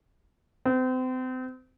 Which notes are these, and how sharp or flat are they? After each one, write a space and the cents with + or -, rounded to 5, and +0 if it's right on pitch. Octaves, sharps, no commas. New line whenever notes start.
C4 -35